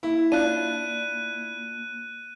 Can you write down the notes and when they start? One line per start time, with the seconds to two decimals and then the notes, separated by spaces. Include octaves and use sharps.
0.03 A#3 E4
0.32 D4 F4 F#6 D#7